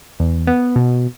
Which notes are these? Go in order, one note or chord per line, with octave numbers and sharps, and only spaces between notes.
E2
B3
B2